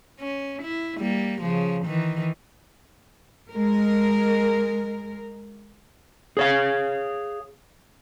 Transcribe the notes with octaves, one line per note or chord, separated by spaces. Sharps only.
C#4
E4
G3 A#3
C#3 F3
D#3 E3
G#3 A#4
G#4 C#5 F5